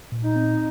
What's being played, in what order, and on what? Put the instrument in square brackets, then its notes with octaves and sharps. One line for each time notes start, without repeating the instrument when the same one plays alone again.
[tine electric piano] A#2
[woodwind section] D#4
[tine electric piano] C4